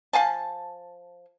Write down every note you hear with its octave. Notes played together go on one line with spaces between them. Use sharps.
F3 F5 G#5 A5